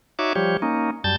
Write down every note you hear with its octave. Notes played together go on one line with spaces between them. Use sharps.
D#4 F#4 C#5 E5 D6
F3 G3 G4 C#5
A#3 C#4 D#4
F#2 G3 A5 G6 A6